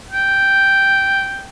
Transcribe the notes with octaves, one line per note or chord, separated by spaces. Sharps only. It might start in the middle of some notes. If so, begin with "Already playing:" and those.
G5